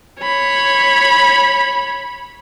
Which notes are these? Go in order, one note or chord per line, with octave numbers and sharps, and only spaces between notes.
C#5 B5